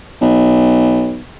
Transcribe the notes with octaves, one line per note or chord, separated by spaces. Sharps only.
B1